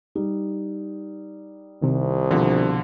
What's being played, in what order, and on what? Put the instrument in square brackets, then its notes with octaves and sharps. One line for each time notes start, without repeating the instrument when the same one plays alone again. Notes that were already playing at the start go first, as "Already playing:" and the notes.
[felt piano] G3 D#4
[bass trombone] C2 [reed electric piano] C3 D#3
[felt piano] B2 D4 [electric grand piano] D3 F3